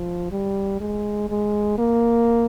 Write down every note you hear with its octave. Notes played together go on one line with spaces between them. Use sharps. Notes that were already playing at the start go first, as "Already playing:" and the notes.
Already playing: F3
G3
G#3
G#3
A#3